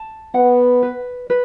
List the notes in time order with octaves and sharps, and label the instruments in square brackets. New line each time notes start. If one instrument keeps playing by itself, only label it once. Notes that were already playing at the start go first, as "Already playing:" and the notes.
Already playing: [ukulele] A5
[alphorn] B3 [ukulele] F#5
[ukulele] B4
B4